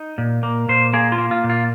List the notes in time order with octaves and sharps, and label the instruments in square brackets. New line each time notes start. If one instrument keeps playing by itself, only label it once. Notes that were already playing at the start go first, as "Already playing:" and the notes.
Already playing: [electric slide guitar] D#4
A#2
A#3
A#2 C5
A#3 G#4
F4
A#3
F4
A#2
F4